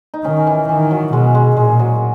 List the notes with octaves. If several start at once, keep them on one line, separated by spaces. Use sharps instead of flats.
D#4
D#3 C#4
E3
D#3 E3
F#3
B2 G#3
G#3
A#2 G#3
F#3